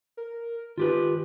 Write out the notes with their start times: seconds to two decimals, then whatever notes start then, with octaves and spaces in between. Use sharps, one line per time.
0.17 A#4
0.78 D#3 F4 G4 B4